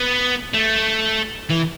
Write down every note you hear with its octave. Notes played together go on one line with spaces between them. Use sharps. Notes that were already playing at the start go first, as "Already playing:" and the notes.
Already playing: B3
A3
E3